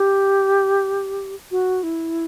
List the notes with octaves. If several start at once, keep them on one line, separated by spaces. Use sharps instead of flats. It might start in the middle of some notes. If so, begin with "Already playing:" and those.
Already playing: G4
F#4
E4